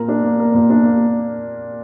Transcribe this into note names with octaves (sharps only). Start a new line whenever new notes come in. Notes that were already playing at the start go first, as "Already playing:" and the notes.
Already playing: A#2 A#4
D4
A#3
A#4
A#2
D4
A#3